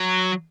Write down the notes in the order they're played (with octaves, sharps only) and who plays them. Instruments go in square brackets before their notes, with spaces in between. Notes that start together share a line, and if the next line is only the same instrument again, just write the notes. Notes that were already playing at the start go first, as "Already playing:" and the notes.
Already playing: [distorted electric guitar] F#3